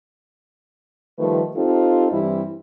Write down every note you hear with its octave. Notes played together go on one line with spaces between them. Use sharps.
D#3 F3 G3 A3 B4
C4 D#4 F4 G4 A4
G2 E3 G3 C4 E4